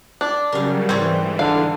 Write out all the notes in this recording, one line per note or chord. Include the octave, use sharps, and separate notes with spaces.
D4
C#3 F#3 G3 A#4 F5
G#2 E3 G3 C4 C#5
D3 F5